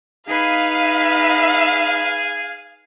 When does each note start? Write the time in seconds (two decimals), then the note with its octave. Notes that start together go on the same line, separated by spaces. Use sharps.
0.28 D#4 G#4 B4 F5